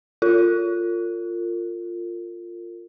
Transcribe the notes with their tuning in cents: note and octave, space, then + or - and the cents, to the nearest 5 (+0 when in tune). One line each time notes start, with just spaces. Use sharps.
F4 +0 A#4 -40